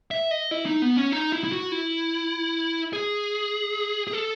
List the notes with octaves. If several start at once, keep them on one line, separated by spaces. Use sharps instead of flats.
E5
D#5
E4
D#4
B3
C#4
D#4
E4
E4
F#4
E4
G#4
G#4
A4